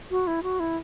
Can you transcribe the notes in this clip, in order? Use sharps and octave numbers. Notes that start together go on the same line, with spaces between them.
F#4
E4
F#4
E4